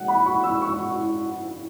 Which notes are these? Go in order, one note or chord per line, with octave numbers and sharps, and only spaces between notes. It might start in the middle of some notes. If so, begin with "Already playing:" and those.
Already playing: F#5
B5
C#6
E6
C#6